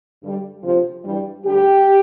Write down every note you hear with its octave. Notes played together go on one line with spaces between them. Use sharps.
G2 D3 G3
D2 C3 F3
G2 E3 G3
D2 D3 G3 G4